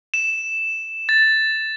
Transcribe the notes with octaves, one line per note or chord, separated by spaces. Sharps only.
E7
A6